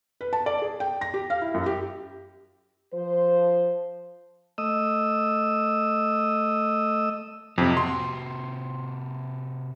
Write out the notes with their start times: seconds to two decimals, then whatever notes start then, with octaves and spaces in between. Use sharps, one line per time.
0.21 B4
0.33 A5
0.46 D5
0.62 G#4
0.80 G5
1.01 A#6
1.14 G4
1.30 F5
1.42 E4
1.54 F#2
1.66 G4
2.94 F3 C5
4.58 A3 D#5 D#6 E6
7.58 F2 C3 F#3
7.77 C3 F#4 C6